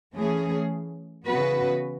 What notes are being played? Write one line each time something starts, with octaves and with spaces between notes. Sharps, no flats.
E3 A3 C#4 G#4
C#3 E3 B3 F#4 B4